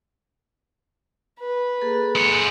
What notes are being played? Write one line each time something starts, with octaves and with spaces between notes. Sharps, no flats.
B4
A#3 G#4 A4
G#3 F#5